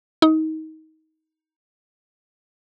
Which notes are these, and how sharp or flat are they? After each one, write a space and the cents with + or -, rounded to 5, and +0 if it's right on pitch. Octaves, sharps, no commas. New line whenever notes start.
D#4 +25